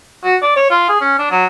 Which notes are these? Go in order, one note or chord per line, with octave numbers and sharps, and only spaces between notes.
F#4
D5
C#5
F4
G#4
C#4
D4
F#3